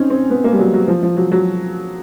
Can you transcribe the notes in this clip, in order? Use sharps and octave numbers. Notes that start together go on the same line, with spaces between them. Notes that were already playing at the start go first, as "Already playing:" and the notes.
Already playing: C4 C#4 D#4
C4
B3
A#3
G3
F#3
F#3
F3
F3
F#3
F#3